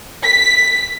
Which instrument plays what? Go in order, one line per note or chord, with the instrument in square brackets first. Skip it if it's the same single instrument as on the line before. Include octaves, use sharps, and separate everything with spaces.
[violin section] B6